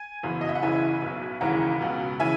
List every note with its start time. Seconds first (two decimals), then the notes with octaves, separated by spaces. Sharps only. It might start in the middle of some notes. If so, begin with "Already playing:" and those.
Already playing: G#5
0.23 F#1 E2 B2
0.41 D#5
0.49 E5
0.55 F#5
0.62 F#1 E2 C#3 E3 E5 G#5
1.02 B1 B2
1.41 E1 D#2 C#3 E3 F#5 A#5
1.81 C#2 B2
2.20 C#3 E3 E5 G#5